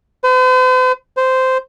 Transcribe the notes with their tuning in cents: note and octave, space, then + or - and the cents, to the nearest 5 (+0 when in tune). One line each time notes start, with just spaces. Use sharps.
C5 -45
C5 -10